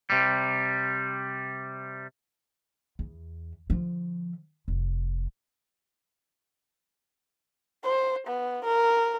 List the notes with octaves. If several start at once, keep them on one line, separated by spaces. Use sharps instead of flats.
C3 G3
E2
D3 F3
F1
C5
B3
A#4